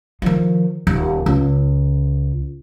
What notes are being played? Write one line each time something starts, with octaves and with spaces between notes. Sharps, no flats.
D#3 F3
D#1 D#2
C#2